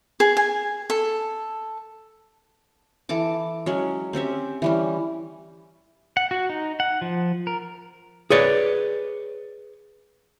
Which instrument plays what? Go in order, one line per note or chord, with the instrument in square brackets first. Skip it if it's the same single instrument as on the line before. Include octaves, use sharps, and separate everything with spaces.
[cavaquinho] G#4
G#5
A4
[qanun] E3 A4 A5 D6
F#3 G#3 C#4
C4 C#4 G4 E5
E3 G3 C#4
[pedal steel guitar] F#5
F#4
D#4
F#5
F3
A#4
[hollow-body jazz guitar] G#4 B4 C#5 D5